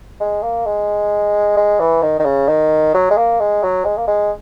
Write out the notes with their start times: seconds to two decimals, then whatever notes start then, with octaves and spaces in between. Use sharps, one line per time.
0.20 G#3
0.43 A#3
0.66 G#3
1.57 G#3
1.80 E3
2.02 D#3
2.20 D#3
2.25 C#3
2.48 D#3
2.94 F#3
3.11 G#3
3.17 A#3
3.40 G#3
3.63 F#3
3.85 G#3
3.97 A#3
4.07 G#3